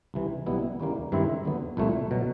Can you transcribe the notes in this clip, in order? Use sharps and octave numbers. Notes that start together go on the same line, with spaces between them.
C2 C3 E3
B1 B2 G3 B3 E4
D#2 C#3 E3 G3 A#3
G2 D#3 G#3 C4 E4
D#2 D3 F#3 B3
C2 A#2 F3 A3
B2 F#3